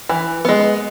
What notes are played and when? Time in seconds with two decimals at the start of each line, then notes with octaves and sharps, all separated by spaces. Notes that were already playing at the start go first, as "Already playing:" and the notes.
0.09 E3
0.45 G#3 B3